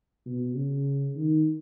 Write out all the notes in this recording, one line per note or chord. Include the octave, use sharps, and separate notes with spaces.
B2
C#3
D#3